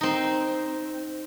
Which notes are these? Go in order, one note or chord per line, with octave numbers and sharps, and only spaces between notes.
C4 D#4